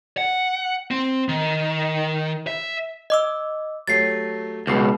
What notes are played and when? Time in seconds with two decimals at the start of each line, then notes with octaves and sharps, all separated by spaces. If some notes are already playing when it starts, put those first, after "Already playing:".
0.18 F#5
0.91 C4
1.28 D#3
2.47 E5
3.10 D#5 D6 E6
3.87 F#3 A3 G4 A6 C7
4.67 C#2 B2 G6 C7